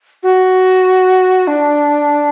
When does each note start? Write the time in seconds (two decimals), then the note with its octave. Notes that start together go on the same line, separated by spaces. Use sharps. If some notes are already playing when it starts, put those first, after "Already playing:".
0.23 F#4
1.47 D4